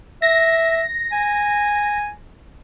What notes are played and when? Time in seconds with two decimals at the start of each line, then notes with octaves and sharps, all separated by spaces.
0.22 E5 A#6
1.12 G#5